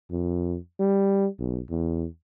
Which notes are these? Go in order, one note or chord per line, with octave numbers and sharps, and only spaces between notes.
F2
G3
B1
E2